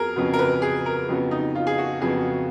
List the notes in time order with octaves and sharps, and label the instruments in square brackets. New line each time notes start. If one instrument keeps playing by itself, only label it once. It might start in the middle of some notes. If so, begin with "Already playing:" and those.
Already playing: [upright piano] F2 F#3 B3 [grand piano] G#4 A#4
[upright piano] F2 C#3 F#3 B3
[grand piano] A#4
B4
G#4
A#4
[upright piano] F2 C#3 F#3 B3
[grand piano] D#4
F4
G#4
F#4
[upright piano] F2 C#3 F#3 B3 [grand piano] G#4